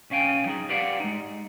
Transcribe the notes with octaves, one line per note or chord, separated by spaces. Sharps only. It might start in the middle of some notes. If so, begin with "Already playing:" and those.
B1 C#4 F5 G5 G#5
F#3 D#4 G#4
G4 B4 C5 D5 F5 F#5
G#3 D#4